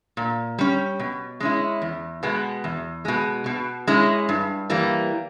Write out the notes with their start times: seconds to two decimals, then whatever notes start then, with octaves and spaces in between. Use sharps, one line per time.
0.17 A#2
0.59 G3 C#4
1.00 B2
1.40 G#3 C#4 E4
1.82 E2
2.23 B2 G#3 B3
2.64 E2
3.05 B2 G#3
3.46 B2
3.87 G#3 C#4 E4
4.29 G2
4.70 E3 G3 A#3